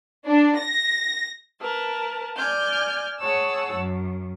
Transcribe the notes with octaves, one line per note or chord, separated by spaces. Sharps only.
D4
A#6
A#4 B4 A5
D5 G#5 F6 G6
G#4 C#5 F#5 A5 E6
F#2